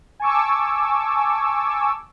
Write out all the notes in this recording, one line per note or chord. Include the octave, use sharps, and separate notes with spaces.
G#5 A5 C#6 D6 E6